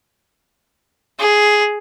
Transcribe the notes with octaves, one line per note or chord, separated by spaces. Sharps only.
G#4